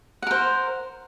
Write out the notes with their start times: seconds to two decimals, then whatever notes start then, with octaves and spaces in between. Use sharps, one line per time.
0.22 F#5
0.27 A#4
0.31 C5